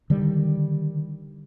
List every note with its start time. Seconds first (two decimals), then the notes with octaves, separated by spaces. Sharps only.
0.10 D3 D#3 G3